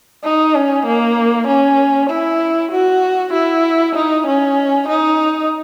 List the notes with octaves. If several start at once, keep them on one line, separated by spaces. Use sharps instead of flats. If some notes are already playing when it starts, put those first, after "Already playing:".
D#4
C#4
A#3
C#4
E4
F#4
E4
D#4
C#4
D#4